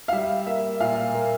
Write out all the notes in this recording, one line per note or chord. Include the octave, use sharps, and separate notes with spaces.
F5
G3 E5
A#3 E5
A#2 F5
A#3